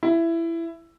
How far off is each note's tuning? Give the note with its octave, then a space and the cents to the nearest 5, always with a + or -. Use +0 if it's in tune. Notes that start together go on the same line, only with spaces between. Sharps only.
E4 +15